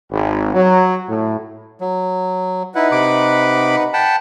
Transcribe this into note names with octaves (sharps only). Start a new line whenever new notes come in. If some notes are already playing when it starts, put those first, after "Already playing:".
G#1
F#3
A2
F#3
D#4 E4 B4 F#5
C3 B5 D6
F#5 G5 A5 B5